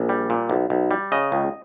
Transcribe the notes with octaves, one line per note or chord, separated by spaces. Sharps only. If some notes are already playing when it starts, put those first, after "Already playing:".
Already playing: A#1
G3
A#2
B1
B1
G3
C#3 D#5
C#2